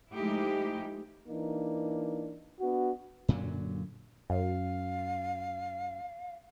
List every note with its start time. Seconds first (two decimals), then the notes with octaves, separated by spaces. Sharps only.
0.12 F3 G#3 A3 D#4 E4 G4
1.28 E3 A#3 D4 D#4
2.60 B3 D4 F#4
3.28 F#2 A#2 D3 F#3
4.30 F#2 F5